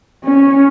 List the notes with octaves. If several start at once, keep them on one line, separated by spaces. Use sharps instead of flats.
C#4